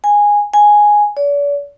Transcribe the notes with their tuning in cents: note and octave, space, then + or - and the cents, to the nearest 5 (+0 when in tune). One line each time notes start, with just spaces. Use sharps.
G#5 -10
G#5 +0
D5 -45